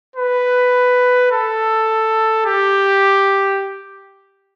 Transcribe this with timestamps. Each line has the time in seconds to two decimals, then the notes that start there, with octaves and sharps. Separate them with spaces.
0.16 B4
1.31 A4
2.46 G4